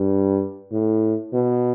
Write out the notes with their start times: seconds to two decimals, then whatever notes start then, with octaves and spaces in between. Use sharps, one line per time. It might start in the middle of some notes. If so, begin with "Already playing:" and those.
Already playing: G2
0.71 A2
1.33 B2